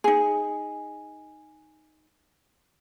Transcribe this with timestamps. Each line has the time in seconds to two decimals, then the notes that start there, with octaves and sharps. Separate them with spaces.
0.04 D#4 G#4